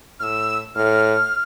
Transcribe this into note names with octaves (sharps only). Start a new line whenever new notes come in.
A2 E6 F6
A2 F6